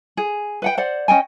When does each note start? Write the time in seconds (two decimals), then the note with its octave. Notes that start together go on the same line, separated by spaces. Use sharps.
0.17 G#4
0.62 B4 F#5 G5
0.77 C5 D5 F#5
1.08 C#4 D#5 G5 G#5